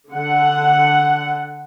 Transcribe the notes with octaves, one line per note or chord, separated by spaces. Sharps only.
D3 F#5